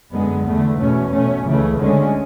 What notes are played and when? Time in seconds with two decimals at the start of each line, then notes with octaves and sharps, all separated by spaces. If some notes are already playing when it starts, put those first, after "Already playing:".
0.13 F#2 D3 G#3 B3
0.45 E2 D3 A3
0.79 E2 B2 A3 C#4
1.11 B2 A3 C#4
1.45 C#2 C#3 E3 A3
1.78 D2 D3 G#3 C#4